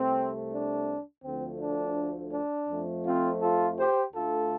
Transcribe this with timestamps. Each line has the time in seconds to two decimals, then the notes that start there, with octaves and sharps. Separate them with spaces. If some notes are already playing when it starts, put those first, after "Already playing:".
Already playing: C2 C3 A3 C4
0.52 D4
1.24 D2 D3 F3 A3 C4
1.60 D4
2.33 D4
2.70 F2 F3 A3
3.05 C4 F4
3.41 F4 A4
3.78 G4 C5
4.13 D2 D3 A3 F4 A4